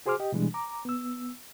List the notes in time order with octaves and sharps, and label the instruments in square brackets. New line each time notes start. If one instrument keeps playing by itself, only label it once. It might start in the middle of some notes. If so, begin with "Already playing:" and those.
[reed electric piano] F#4 G#4 C5 C6 D6 F6
G4 D#5 G5
B2 E3 G3 G#3 D4
A#5 D6
B3 E6